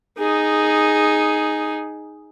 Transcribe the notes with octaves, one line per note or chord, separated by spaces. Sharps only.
D#4 G#4